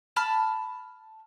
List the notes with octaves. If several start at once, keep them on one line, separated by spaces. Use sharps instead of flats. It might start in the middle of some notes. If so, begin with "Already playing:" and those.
A5 B5 F6